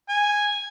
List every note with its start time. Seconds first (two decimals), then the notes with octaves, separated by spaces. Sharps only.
0.09 G#5